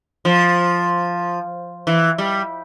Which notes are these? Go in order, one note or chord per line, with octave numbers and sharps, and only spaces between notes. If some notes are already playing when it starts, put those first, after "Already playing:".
F3
E3
G3